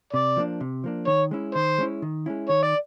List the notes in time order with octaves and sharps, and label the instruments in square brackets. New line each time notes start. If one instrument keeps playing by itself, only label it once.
[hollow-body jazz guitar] C3 [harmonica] D5
[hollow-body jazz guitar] F3 A#3 D4
C3
F3 A#3 D4
[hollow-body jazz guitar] D#3 [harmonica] C#5
[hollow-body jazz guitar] G#3 C#4 E4
[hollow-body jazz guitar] D#3 [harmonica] C5
[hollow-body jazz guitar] G#3 C#4 E4
D#3
G#3 C#4 E4
[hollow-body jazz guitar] D#3 [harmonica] C#5
[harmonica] D5